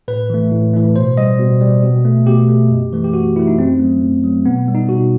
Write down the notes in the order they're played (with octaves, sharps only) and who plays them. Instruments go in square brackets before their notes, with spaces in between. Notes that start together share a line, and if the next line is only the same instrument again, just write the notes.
[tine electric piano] A2 B4
E3 A3
A2
E3 A3
B2 C5
G3 D#5
B2
G3
B2
A3
B2 G4
A3
F#2
E3 A3
G4
F#2 F#4
E3 A3 E4
D#4
F#2 C4
F#3 A3
F#2
F#3 A3
B2 B3
G3
D#4
B2 F#4